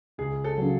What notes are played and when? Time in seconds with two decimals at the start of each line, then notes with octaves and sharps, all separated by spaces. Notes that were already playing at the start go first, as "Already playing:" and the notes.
0.18 C#2 G#4
0.44 A4
0.57 C#3 F#3